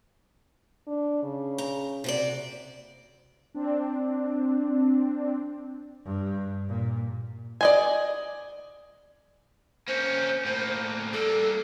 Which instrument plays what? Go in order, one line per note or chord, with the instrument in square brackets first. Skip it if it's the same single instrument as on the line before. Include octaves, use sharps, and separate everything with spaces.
[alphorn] D4
C#3
[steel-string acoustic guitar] A#5
C3 F#4 D5
[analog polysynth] C4 D4
[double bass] G2
A#2
[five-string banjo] D5 D#5 G#5
[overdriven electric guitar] A#3 C#4 [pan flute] C5
[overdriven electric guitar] A2 A#3
[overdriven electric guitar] G3 A#3 [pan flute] A4